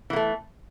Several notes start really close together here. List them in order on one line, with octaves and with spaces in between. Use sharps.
E3 A#3 A3